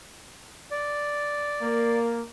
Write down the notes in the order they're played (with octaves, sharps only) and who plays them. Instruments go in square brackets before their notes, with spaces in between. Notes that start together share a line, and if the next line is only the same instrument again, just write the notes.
[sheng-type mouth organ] D5
[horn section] A#3